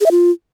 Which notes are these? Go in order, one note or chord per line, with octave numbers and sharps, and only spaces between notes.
G#4
E5
F4